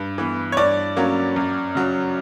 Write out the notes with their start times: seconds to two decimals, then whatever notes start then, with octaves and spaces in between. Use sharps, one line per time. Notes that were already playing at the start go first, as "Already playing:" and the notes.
Already playing: G2
0.18 E3 B3
0.52 C#5
0.57 G2 D5
0.97 F#3 A#3 C#4
1.36 F#2
1.75 C#3 F#3